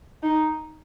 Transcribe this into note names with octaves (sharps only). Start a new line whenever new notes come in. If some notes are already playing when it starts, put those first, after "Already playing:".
D#4